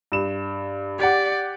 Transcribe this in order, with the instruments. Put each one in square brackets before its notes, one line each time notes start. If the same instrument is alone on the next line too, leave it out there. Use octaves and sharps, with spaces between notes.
[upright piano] G2 E7
[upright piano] G4 F#5 [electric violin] D5